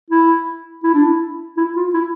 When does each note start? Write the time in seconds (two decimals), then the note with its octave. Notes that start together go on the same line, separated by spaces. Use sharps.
0.10 E4
0.84 E4
0.94 D4
1.05 E4
1.57 E4
1.76 F4
1.94 E4